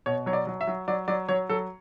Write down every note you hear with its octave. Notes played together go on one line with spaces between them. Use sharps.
B2 C#5
F#3 C#5
D5
F#3
E5
F#3
F#3 D5
F#3 D5
F#3 C#5
F#3 A4